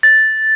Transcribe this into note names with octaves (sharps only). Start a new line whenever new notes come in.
A6